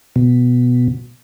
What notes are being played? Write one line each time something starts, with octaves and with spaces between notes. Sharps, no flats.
B2